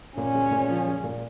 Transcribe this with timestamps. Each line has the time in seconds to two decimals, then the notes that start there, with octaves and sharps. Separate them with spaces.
0.17 A#2 C#4
0.35 G#3
0.51 A#2
0.69 F3
0.87 G#3
1.04 A#2